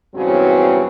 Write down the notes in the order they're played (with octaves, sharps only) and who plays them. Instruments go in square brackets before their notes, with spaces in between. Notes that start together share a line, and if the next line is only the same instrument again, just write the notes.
[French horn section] E2 G2 C#3 F#3 C4